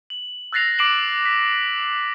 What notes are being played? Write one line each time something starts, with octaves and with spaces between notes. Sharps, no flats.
F#7
E6 F#6 A6 A#6 C7 F7
D6 C7 D7 E7 F#7
B6